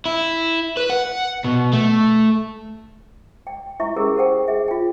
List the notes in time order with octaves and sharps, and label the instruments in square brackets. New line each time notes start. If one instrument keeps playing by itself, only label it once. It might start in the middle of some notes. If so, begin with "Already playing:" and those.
[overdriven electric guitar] E4
B4
F#5
B2
A3
[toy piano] G5
E4 E5 C#6
C#4 E4 G4 G#4 A#4
G4 A4 C5 F#5 G5
G#4 E5
F4 G5